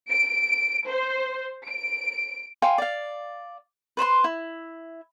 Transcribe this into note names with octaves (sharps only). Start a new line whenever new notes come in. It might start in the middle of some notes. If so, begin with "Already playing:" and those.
D7
C5
D7
F5 G5 G#5 C6
D5 F5
B4 C5 B5 C6
E4